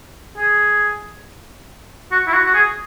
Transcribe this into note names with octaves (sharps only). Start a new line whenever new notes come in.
G#4
F#4
E4
F#4
F#4
G#4